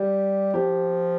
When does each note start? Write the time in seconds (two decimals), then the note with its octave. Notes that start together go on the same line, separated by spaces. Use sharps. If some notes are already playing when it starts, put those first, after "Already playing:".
Already playing: G3 G4
0.54 F3 G4